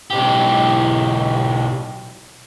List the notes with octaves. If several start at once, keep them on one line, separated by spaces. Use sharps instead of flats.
B1 G4